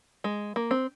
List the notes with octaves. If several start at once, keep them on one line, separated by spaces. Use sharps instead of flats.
G#3
A#3
C4